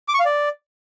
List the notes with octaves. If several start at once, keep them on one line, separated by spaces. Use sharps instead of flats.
D6
C#6
F5
D5